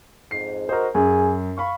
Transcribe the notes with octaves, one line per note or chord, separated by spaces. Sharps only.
F2 G#2 C7
G#2 F#4 A#4 C5 D#5
F#2 G#4
F5 B5 C#6